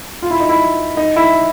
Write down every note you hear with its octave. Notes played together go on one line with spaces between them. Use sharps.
F4
E4
D#4
E4
D#4
E4